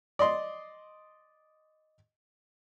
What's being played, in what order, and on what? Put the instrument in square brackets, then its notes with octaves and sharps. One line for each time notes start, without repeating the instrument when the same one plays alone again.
[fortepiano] D5 D#5 C6